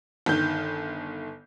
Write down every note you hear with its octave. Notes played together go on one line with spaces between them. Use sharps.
G1 D#3 G6